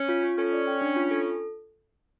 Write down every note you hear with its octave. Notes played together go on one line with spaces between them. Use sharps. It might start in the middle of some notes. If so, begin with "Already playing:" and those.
Already playing: C#4
F4
F4
C#4 A4
D5
G5
D4
F4
A4